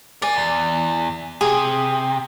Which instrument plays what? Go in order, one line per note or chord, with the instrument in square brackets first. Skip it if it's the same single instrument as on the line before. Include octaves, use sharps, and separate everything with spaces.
[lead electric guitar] A#4 G#5 [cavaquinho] D5
[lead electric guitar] E2
[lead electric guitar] C3 [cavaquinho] G#4